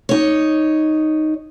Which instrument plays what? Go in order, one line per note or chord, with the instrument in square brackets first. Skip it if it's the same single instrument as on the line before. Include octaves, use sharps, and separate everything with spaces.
[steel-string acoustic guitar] D#4 C#5